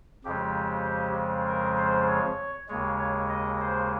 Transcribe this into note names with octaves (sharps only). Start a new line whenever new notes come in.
F2 C#3 F3 G#3 G4
A#4
C5
C#5
D#2 C#3 G#3 C#5
C#5
D#5
C5